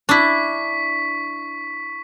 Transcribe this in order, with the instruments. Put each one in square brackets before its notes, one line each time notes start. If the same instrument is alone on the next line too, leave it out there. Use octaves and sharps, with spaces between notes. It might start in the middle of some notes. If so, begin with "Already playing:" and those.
[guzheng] D4 E4 [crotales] C#6 B6